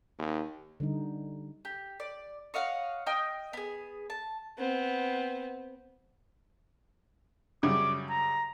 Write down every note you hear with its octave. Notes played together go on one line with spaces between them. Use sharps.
D#2
D3 G3 D#4
G4
D5
C#5 D#5 F5 F#5
D#5 G5 D#6 F6
B3 G#4
A5
B3 C4
F#2 C#3 G3 D6
A#5